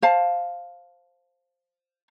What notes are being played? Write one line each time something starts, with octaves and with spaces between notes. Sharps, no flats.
C5 F5 A5